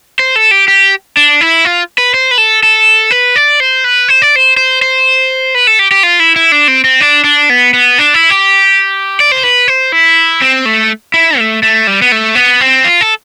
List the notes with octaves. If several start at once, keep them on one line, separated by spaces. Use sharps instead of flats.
C5
A4
G4
G4
D4
E4
F4
B4
C5
B4
A4
A4
B4
D5
C5
B4
C5
D5
C5
C5
C5
B4
A4
G4
G4
F4
E4
E4
D4
C4
C4
D4
D4
B3
B3
D4
E4
G4
D5
C5
B4
C5
E4
C4
A3
E4
A3
A3
G3
B3
A3
B3
C4
F4
A4